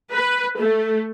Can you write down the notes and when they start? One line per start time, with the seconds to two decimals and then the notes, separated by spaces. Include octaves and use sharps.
0.12 B4
0.58 A3